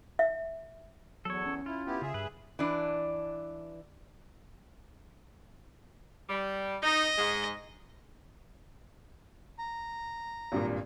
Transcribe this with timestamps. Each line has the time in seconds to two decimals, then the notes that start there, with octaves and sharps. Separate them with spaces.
0.19 E5
1.25 E2 F#3 A4 C#5
1.46 C#4
1.66 E4 F4
1.86 B3 E4 G4
2.02 C#3 G#4 E5
2.14 G2 B4
2.59 E3 D4
6.29 G3
6.83 D#4 D#5
7.18 G#2 G#3
9.59 A#5
10.52 G#1 G2 A#2